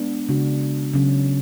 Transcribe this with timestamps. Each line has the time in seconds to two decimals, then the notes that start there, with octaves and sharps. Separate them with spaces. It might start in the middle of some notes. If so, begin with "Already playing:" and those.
Already playing: G#3 B3 D4
0.29 C#3 G#3 D4 F#4
0.93 C#3 F#3 C#4